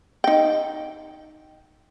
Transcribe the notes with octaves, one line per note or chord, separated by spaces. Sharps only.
D#4 G5